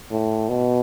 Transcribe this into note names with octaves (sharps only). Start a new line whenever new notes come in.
A2
B2